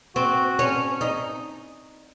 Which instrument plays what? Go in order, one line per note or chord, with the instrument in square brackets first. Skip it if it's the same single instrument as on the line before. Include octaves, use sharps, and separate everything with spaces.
[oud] C4 [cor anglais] F#4
[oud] C#4
D#4